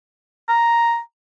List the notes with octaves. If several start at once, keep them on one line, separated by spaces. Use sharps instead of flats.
A#5